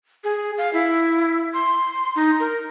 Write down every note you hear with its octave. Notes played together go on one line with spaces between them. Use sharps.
G#4
F5
E4
C6
D#4
A#4